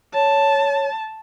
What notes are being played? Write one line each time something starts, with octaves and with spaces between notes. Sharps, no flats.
C#5 A5